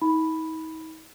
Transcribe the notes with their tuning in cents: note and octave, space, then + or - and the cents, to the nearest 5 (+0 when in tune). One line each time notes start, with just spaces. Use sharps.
D#4 +40 B5 +0